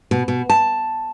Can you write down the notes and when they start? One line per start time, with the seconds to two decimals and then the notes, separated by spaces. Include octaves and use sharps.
0.11 B2
0.28 B2
0.50 A5